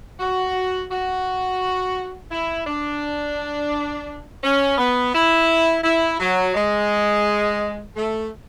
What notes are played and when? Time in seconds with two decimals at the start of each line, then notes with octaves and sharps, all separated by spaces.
0.20 F#4
0.91 F#4
2.31 E4
2.67 D4
4.43 C#4
4.78 B3
5.14 E4
5.84 E4
6.20 F#3
6.55 G#3
7.96 A3